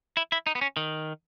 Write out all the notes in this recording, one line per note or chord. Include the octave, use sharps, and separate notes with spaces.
E4
E4
D#4
B3
C#4
D#3